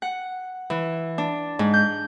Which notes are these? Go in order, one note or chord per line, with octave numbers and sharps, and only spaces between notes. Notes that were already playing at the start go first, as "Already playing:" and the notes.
F#5
E3
D4
G#2
G6